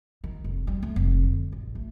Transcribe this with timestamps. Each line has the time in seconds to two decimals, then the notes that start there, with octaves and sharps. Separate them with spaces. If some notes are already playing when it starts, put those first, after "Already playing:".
0.24 D#3
0.44 F1
0.67 G3
0.83 A3
0.96 F1
1.24 D3
1.52 A1
1.75 A3